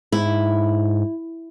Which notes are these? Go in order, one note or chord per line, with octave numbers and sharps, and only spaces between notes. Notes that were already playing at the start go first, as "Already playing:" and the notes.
G#2 E4